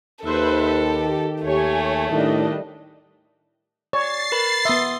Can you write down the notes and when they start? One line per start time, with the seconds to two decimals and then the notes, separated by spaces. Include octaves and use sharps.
0.25 D#2 D#3 A4 B4 C5 E5
0.82 G4
1.44 D#2 A3 G4 C#5 G#5
2.10 A2 D#3 G3 D4 D#5
3.93 C#5 D5 A6 C7
4.32 A#4 B4 B5
4.65 B3 E5 C6 D#6